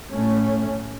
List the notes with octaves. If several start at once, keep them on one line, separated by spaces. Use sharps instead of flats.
A2 A3 C#4